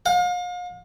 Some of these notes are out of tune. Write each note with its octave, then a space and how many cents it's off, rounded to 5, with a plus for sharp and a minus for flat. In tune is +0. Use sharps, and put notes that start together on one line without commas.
F5 +40